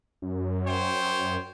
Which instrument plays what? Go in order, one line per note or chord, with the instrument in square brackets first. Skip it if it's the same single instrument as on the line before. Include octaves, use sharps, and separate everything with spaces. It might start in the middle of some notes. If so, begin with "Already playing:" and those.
[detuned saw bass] F#2
[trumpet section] C5 C#5 G5